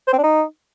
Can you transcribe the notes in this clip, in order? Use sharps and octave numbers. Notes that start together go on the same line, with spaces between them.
C5
C4
D4
D#4